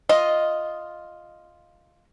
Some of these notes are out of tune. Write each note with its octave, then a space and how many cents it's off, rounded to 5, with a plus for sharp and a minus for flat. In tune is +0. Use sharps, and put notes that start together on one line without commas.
F4 +0 D#5 +0